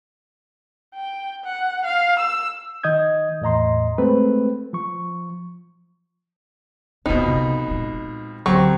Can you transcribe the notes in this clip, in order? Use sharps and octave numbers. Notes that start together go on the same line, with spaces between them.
G5
F#5
F5
E6
D#3 D#5 D#6 G6 G#6
E2 A2 D#5 A#5 C6
G#3 A3 C4 B4
F3 C#6
A#1 F2 B2 D#4 F4
C3
A#2 G#3
D2 F#3 C4 G4 C#6